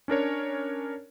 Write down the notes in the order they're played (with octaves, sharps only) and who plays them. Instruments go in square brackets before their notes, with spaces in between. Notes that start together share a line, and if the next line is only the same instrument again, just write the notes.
[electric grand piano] C#4 D4 A#4 C#5